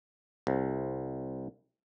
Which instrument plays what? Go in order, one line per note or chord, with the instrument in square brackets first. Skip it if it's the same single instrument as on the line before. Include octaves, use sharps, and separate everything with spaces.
[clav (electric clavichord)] C2